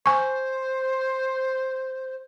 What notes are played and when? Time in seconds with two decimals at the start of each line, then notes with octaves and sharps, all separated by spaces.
0.06 C5 G#5 C#6